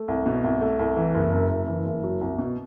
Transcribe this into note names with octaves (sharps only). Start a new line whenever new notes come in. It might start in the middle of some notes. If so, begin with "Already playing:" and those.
Already playing: A3
C2
B2
C2
A3
C2
E3
F#1
F#2
F#1
E3
F#1
F#3
C2
B2